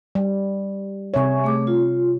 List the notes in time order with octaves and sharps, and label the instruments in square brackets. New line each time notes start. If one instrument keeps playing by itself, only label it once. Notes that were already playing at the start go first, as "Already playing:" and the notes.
[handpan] G3
[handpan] C3 C#5 [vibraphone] E5 G#5 C#6
[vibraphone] A3 G#4 D6
F4